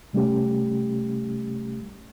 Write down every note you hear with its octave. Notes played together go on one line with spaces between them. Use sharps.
C3 G3 A3 C#4 G4